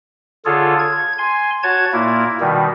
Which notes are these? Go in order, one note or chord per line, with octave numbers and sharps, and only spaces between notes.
D3 F4 G#4 A4 C#5
G#6
G#5 C6
F#4 C#5 A5 G#6
A#2 A#3 E4
B2 D#3 G3